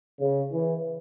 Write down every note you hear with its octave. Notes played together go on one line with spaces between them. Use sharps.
C#3
E3